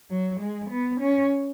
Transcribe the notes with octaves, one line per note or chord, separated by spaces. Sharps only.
F#3
G#3
B3
C#4